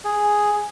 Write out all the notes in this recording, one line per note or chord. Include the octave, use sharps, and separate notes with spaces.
G#4